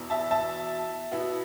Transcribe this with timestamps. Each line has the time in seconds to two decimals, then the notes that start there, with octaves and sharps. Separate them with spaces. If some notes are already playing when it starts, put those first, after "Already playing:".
Already playing: E2 B2 B3 E4
0.10 E5 A5
0.31 E5 A5
1.11 B2 B3 E4